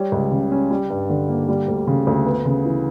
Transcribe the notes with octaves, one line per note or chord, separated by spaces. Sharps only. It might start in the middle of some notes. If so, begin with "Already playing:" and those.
Already playing: G3 C#5
C#2
C#3
C#4
G3
G2
D3
A#3
G3
D2
C#3
D2
B3
C#3
E3